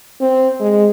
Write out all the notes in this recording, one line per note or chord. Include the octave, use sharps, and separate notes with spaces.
C4
G#3